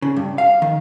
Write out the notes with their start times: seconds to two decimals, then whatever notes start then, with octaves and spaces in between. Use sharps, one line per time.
0.02 C#3
0.17 G2
0.38 F5
0.62 D#3